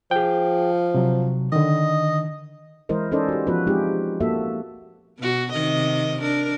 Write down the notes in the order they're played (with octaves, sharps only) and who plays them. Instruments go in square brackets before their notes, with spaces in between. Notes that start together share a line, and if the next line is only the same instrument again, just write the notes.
[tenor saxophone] F3 [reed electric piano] G#4 G5
[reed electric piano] C3 F#3
[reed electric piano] D3 D#3 [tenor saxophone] D#5
[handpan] E3 G#3 E4 A#4 C5 D#5
C#4 D#4 A4 C5 D5 D#5
F#4 G4
F3 B3 C#4 F4 F#4 B4
G#3 C4 D#4 F4 G4 G#4
A#3 F#4 A4 E5
[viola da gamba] B2 F#4
C3 D#3 D#5
D4 A#4